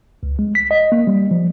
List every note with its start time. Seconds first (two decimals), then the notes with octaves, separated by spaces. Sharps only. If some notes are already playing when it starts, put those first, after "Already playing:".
0.23 C#2
0.39 G#3
0.55 B6
0.71 D#5
0.92 A#3
1.07 G3
1.31 F3